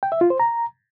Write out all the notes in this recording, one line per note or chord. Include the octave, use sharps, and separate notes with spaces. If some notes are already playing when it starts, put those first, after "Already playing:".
G5
E5
F4
C5
A#5